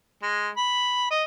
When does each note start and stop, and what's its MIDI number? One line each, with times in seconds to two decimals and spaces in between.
0.22 0.49 56
0.57 1.08 83
1.11 1.24 75